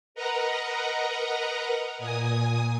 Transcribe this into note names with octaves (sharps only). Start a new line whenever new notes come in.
A#4 B4 D#5 F#5 A#5
A#2 G#5 D#6